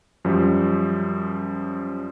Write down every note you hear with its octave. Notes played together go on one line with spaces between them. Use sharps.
F#2 F3 G3